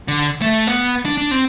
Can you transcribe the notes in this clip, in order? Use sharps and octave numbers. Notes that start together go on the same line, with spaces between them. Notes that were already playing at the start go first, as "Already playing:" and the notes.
D3
A3
B3
D4
D4
C4